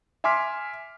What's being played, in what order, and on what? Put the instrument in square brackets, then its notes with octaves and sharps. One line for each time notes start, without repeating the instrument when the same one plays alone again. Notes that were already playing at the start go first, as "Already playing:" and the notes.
[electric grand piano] E5 G#5 C6 D6 F6 B6